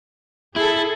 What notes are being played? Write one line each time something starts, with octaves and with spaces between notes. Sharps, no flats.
E4 G#4 A4